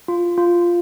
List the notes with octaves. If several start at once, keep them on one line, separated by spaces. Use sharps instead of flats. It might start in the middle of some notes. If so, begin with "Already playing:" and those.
F4
F4